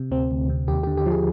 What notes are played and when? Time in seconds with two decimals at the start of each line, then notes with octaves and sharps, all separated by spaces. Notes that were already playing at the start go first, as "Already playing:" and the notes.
Already playing: C3
0.11 D2 C4
0.31 D2
0.49 C3
0.68 D#2 G4
0.83 D3 G4
0.97 G4
1.06 F3 G#4